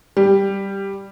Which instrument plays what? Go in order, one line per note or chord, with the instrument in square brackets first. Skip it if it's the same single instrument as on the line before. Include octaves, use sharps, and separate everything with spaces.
[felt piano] G3